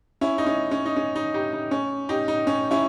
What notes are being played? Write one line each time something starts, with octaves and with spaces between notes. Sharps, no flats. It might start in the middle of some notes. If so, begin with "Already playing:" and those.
C#4 E4
D#4
C#4
C#4
D#4
C#4
D#4
D#4 G4
D#4
C#4
D#4 G4
D#4
C#4
C#4 E4